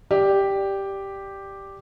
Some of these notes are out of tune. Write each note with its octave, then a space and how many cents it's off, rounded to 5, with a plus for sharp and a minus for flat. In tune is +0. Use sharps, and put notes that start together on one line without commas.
G4 +0 D5 +0